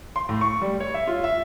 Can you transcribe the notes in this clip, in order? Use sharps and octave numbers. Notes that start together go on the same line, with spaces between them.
C6
A2
C#6
G3
C#5
E5
F4
E5